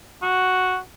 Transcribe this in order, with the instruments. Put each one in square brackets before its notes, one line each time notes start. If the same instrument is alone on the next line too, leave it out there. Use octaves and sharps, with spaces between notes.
[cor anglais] F#4